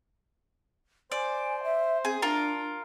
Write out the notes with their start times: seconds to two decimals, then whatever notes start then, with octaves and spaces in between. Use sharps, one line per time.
1.12 C5 D5 G#5
1.64 E5
2.05 C4 G#4
2.22 D4 F4 A#4